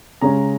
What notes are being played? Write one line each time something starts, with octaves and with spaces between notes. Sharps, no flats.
C#3 G#3 C#4 A#5